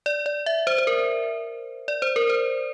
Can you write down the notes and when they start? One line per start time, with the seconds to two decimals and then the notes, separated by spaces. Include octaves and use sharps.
0.06 D5
0.26 D5
0.46 E5
0.67 C5
0.78 C5
0.87 A#4
1.88 D5
2.02 C5
2.16 A#4
2.29 C5